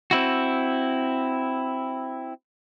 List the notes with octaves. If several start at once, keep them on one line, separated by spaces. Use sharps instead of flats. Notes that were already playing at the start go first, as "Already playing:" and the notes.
C4 E4 F#4